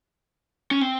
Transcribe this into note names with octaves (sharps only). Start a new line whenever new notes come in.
C#4
C4